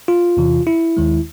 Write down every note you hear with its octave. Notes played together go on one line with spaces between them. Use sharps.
F4
E2 C3 E3
E4
D#2 D#3 G#3